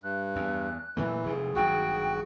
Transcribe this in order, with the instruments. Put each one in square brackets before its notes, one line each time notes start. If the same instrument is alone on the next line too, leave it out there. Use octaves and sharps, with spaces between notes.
[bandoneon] G2 [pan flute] F#6
[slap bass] E2
[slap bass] A#2 F#3 A3 [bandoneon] E3
[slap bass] F1 G#2 [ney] G#4
[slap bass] G#1 G2 F#3 [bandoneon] F#4 [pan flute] G5